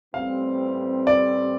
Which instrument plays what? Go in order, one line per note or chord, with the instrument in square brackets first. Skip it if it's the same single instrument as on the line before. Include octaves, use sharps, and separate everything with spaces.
[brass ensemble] A1 A2 E3 G3 C4 [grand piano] F5
[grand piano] D5